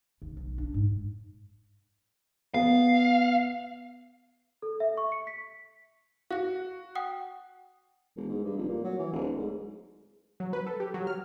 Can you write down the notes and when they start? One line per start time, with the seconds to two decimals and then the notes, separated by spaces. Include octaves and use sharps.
0.22 D#2
0.37 B1
0.58 D4
0.74 G#2
2.54 B3 F5
4.62 A4
4.80 E5
4.97 C#6
5.12 C#7
5.27 B6
6.31 F#4 F5 A#6
6.95 F#5 G5 D#6
8.16 E1
8.29 G#2
8.44 G2
8.57 F1
8.68 A#2
8.84 F#3
8.99 E3
9.13 D1
9.38 G#2
10.40 F#3
10.53 B4
10.67 A4
10.80 G4
10.94 F#3
11.07 F6